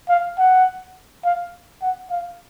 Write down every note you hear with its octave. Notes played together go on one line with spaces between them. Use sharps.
F5
F#5
F5
F#5
F5